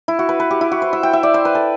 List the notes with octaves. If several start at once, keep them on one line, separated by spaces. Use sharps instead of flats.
E4
F#4
B4
B4
G4
E4
F#4
C5
E5
G5
E5
D5
C5
B4
A4